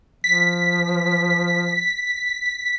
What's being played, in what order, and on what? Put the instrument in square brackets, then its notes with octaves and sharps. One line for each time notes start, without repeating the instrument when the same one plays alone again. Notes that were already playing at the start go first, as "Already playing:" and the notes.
[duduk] F3 [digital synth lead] B6